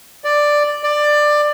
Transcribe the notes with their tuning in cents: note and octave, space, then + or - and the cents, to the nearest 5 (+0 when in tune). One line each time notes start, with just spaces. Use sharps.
D5 +5
D5 +15